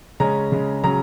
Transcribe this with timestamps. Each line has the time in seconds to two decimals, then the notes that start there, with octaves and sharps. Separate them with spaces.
0.20 C#3 G#3 C#4 A#5
0.52 C#3 G#3 C#4
0.83 C#3 F#3 C#4 A#5